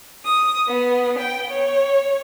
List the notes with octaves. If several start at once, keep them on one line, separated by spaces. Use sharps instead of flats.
D#6
B3
G5
C#5